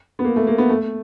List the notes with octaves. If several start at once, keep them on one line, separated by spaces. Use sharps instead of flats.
B3
A#3
A3
A#3
B3
A3